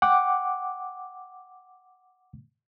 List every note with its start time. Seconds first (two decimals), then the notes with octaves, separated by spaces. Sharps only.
0.02 F#5 G5 D6